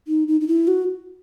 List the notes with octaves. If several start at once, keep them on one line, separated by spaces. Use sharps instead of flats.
D#4
D#4
D#4
E4
F#4